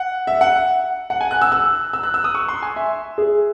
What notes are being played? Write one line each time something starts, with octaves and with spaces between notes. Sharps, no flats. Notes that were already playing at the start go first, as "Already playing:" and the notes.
Already playing: F#5
E5
F#5
F#5
G#5
F#6
E6
E6
E6
F#6
E6
D#6
C#6
C6
G#5
E5
G#4